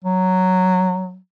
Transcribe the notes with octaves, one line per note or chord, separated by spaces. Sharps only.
F#3